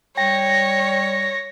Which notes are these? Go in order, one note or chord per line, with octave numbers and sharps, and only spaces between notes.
G3 C#5 G5 A#6